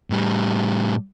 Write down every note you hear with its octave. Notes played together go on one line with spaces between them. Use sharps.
A2 G3